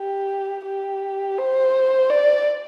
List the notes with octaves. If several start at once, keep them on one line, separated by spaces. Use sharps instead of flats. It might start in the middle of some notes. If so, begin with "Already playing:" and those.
Already playing: G4
G4
C5
D5